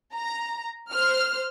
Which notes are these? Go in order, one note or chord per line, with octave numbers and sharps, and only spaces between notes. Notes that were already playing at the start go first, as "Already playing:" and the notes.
A#5
C5 F6